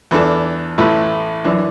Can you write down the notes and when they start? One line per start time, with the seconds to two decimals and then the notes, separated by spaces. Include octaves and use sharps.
0.11 E2 E3 D4 A4
0.78 A1 A2 A3 E4 B4
1.44 F#2 E3 D4